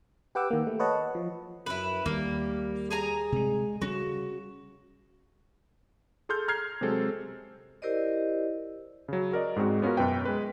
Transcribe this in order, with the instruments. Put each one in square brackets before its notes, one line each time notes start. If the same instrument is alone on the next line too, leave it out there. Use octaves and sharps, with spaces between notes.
[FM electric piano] G4 B4 F#5 G5 D6 E6
D#3 A#3
A3
B4 C#5 D#5 F#5 A5
F3
[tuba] F#2 [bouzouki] E4 B4
[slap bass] D#2 [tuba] G3 [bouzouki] A#3
[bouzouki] G#4 G#5 A#5
[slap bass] C3 G3 [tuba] G#3
[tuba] C#3 [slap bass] G3 C#4 [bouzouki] F#4
[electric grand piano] G#4 A4 C6 F6 G6
A#5 F6 G#6 C7
C3 F#3 G#3 C4 A4
[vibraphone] E4 G4 A#4 C5 D5 D#5
[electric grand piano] C#3 F#3
F#4 A#4 D5 D#5
G#2 G#3 C4 F#4
B3 C#4 F4 F#4 A#4
F#2 B2 B4 G5
G#3 B4